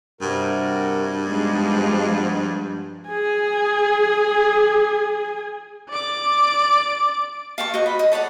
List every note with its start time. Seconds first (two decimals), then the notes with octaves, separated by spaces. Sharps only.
0.21 G2 C3 F#4 A#4
1.27 F3 G#3 B3 D#4 F#4
3.09 G#4 G#5
5.89 D5 D6
7.58 F5 G5 A5 C#6
7.74 F#4 C5 D#5 C#6
7.86 B5
7.99 D#5
8.12 A4 C#5 D5 F#5